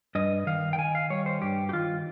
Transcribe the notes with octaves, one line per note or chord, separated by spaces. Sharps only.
G2 D#5
D#3 F5
G5
D#3 G#5
F5
G3 C#5
C5
G2 G4
G4
D#3 F4